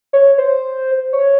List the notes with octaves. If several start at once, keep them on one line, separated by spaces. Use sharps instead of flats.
C#5
C5
C#5